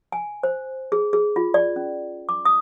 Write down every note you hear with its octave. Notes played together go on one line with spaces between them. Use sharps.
G#5
C5
G#4
G#4
F4
D5
C#4
D6
D#6